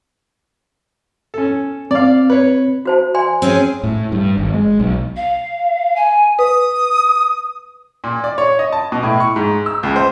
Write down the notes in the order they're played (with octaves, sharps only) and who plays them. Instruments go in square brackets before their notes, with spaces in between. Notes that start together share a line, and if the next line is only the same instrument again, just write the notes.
[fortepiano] C#4 A4
[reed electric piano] C4 [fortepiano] D5 F5
[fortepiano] B4 C#5
[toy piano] F#4 C5 A5
D5 G#5 C6
[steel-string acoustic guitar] C4 C#4 G#4
[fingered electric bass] A2
G2
G#1
G#3
B1
[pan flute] F5
G#5
[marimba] B4 [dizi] D#6
[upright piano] A#2
D5
C#5
D#5
A5
B2
A2
C#6
G#2
E6
C#2
C5